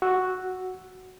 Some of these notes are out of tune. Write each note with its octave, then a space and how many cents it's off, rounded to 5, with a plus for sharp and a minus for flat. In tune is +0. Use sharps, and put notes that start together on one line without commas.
F#4 +0 E6 +0